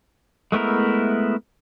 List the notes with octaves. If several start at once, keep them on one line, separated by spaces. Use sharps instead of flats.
G#3 A3 B3 E4 A#4